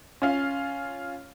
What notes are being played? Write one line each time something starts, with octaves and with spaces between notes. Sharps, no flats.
C#4 F4 F5